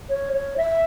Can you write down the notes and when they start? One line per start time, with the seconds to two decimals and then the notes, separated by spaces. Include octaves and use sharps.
0.10 C#5
0.33 C#5
0.57 E5